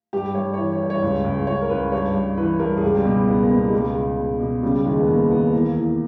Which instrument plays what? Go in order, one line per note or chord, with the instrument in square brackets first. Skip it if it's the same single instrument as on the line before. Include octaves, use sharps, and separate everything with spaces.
[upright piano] G2 G4
G2 C#5
E3 C#5
C#5
G2
C#5
C#2
C#2
C#2 C#5
A#4
C#2 B4
G2 C#5
G2
E3 B4
G2 A#4
G#4
C#2 G4
G3
B2 G#3
C#2 B3
A#3
B2
G#3
C#2 G3
G#3
C#2
B2
B2
C#3 G3
D#2 G#3
B3
D#2 A#3
D#2 B3
E2 A#3
E2